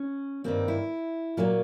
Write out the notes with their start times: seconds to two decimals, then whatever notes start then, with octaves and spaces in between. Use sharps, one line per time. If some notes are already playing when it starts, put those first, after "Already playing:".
Already playing: C#4
0.44 G2 D#3 G3 A#3 C4
0.68 E4
1.37 A#2 F#3 A#3 F4